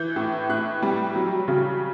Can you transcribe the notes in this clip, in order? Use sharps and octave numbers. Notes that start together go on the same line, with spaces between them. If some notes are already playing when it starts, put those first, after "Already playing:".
Already playing: E3 G6
A2
A2 F#6
G3
F#3
C#3